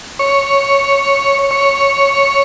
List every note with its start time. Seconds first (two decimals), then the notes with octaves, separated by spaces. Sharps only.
0.19 C#5
1.51 C#5